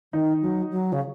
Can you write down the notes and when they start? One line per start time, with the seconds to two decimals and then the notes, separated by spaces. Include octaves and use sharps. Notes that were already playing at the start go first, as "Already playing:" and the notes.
0.13 D#3 D#4
0.42 F#3
0.71 F#3
0.92 C#3